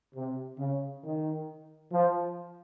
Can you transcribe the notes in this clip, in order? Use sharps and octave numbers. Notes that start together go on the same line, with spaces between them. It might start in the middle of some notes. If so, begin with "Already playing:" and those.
C3
C#3
D#3
F3